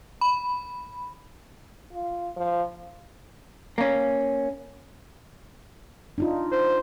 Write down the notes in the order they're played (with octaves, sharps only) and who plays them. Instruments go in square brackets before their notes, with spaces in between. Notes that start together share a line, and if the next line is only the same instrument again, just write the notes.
[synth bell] B5
[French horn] F4
F3
[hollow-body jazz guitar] A#3 C#4
[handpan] D4 D#4 F4
[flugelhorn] C5